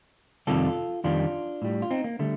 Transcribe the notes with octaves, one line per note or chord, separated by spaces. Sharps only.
F2 C3 D#3 G3 F4 A4
F2 D#3 G3 D4 F4
A2 G3
F4
C4 D#4
A#3
D3 G3 A3